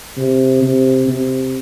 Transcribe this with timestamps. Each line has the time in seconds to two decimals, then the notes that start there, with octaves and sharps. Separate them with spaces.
0.18 C3
0.62 C3
1.08 C3